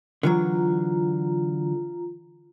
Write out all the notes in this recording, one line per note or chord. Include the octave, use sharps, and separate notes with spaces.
D3 E3 F#3 F4 A#5